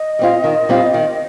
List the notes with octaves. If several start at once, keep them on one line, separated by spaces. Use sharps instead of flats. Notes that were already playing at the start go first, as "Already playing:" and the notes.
Already playing: D#5
G3 C4 F4
D#3
G3 C4 F4
D#3